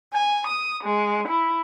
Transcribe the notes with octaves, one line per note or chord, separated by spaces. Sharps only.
G#5
D#6
G#3
E4